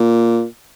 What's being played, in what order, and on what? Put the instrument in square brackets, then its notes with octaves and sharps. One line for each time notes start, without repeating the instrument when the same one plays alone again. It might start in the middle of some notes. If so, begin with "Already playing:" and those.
Already playing: [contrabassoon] A#2